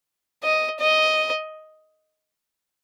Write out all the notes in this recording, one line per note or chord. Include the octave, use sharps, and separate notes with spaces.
D#5
D#5